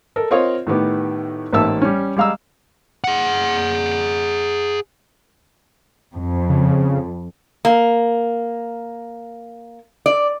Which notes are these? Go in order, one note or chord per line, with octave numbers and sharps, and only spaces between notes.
A4 A#4
C4 F4 A#4 C#5 D#5 F5
A2 D#3 B3 G4
A1 G#2 A#3 E5 A5 E6
G3 C#4
G3 G#3 F5 A#5 E6
G#4 F#5
F2
C#3
A#3
D5